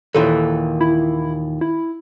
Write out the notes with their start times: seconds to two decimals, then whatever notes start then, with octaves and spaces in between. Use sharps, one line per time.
0.15 D#2 A#2 E3 A4
0.81 E4
1.61 E4